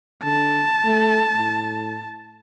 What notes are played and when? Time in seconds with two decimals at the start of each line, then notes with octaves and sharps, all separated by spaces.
0.23 D3 A5
0.85 A3
1.36 A2